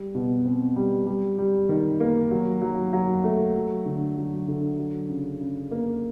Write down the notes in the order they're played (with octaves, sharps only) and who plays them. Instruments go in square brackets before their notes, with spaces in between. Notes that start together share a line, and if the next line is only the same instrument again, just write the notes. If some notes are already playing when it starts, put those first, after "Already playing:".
Already playing: [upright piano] G3
B2
C4
G3
G3
G3
D#3
A#3
F#3
F#3
F#3
A3
F#3
D3
F#3
D3
F#3
C#3
C#3
A#3